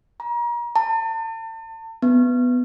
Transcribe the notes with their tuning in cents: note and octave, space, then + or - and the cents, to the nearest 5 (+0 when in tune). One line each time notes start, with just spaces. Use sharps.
A#5 +35
A5 +35
B3 +5